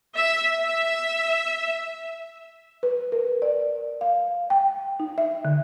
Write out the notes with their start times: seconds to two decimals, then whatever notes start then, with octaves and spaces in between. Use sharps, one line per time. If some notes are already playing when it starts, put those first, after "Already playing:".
0.16 E5
0.62 E5
2.83 B4
3.12 A#4
3.42 D5
4.01 F5
4.50 G5
5.00 D#4
5.18 E5
5.45 D3